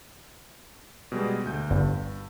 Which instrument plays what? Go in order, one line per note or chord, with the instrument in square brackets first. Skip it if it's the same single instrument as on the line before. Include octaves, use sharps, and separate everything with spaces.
[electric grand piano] B2 G3 G#3
D2 G6
[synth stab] G1 [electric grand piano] G2